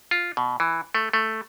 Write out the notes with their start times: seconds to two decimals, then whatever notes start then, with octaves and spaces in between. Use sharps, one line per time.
0.11 F4
0.37 B2
0.60 E3
0.95 A3
1.13 A3